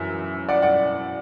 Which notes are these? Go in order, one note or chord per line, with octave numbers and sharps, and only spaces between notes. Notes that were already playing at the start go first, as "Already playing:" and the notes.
Already playing: F#2 E3 E5
D5 F#5
D5 F#5